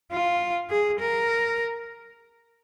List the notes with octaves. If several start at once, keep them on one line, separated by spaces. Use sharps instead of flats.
F4
G#4
A#4